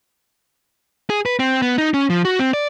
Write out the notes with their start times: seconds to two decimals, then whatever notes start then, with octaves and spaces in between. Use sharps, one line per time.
1.10 G#4
1.26 B4
1.39 C4
1.62 B3
1.78 D#4
1.94 C#4
2.10 F3
2.25 F#4
2.39 C4
2.53 D5